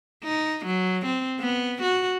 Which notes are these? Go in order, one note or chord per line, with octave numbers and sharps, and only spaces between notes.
D#4
F#3
C4
B3
F#4